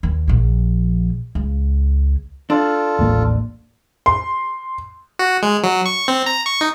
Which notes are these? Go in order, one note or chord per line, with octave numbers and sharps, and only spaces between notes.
D#2
A#1 F3
C#2
D4 F4 A4
D#1 A1 A#3
C6
F#4
G#3
F#3
C#6
C4
A#5
C#6
D#4